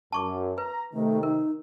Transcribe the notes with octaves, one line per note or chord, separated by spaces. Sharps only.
F#2 A5 C#6 D6
B4 A#5
C3 D#3 A3
D#4 A#4